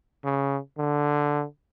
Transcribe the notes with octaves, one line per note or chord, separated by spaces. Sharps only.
C#3
D3